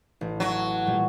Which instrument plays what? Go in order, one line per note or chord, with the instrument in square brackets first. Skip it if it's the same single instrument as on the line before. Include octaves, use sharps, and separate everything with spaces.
[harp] A1
[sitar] F#3
[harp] A#2 G3 A3